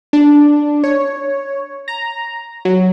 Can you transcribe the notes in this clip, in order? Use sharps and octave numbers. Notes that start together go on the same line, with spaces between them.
D4
C#5
A#5
F#3